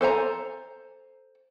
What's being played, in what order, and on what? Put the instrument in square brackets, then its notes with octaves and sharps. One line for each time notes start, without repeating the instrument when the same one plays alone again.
[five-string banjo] A4 C5 G#5 A#5